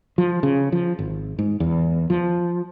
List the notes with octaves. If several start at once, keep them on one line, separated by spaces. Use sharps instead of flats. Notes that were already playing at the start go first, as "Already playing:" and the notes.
F3
C#3
F3
G#1
G#2
E2
F3